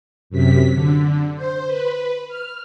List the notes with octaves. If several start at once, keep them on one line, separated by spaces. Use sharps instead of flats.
F#2 C3 B6
D3
C5
B4
F6